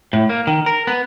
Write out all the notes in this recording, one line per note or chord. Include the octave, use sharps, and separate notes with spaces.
A2
A#3
D#3
A#4
B3